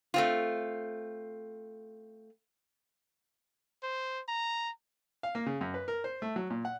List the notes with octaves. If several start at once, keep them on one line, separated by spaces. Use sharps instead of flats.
A3 C4 F4
C5
A#5
F5
A#3
C#3
F#2
B4
A#4
C5
A3
F#3
A#2
F#5